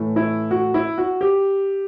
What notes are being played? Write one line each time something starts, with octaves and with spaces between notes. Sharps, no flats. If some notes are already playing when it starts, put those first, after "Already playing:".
Already playing: A2 E3 A3
E4
F#4
E4
F#4
G4